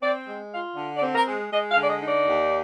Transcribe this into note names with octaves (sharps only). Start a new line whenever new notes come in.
C4 D5
G#3
F4 F5
D3
D5
C4
A#4
G#3
G#3 D#5
F5
D3 D5
D#5
D#4
D5
D#2